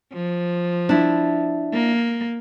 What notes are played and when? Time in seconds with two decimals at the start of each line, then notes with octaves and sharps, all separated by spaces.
0.13 F3
0.89 D4 E4
1.73 A#3